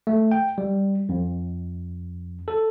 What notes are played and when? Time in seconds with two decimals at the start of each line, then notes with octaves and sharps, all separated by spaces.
0.07 A3
0.31 G5
0.58 G3
1.09 F2
2.48 A4